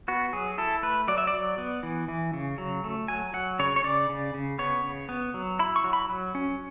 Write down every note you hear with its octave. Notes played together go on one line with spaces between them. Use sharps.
B3 F#4
F#3 G#4
E4 A4
A3 B4
F#3 D5
E5
D5
F#3
B3
E3
E3
C#3
F#3
A3
F#3 G#5
F#3 F#5
C#3 C#5
C#5
C#3 D5
C#3
C#3
B3 C#5
C#3
B3
F#3
E4 B5
C#6
F#3
B5
F#3
C#4